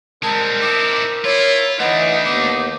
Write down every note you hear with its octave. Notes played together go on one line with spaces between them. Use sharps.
G3 G#3 C4 A#4 A5
D#4 E4 D6
E4 F4 C#5
E3 A3 D4 D#4 B4 D#5 F#5
D#2 B3 D6